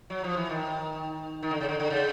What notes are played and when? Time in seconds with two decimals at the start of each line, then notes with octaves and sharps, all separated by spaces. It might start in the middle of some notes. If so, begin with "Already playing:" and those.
0.10 F#3
0.24 F3
0.37 E3
0.50 D#3
1.43 D#3
1.51 D3
1.61 C#3
1.68 D3
1.80 D3
1.90 C#3